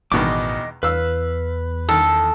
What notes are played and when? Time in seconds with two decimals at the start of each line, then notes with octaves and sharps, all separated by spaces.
0.12 A1 E2 B2 D#3 D#5 D6
0.83 E2 B4 F5 E6
1.89 D#3 A4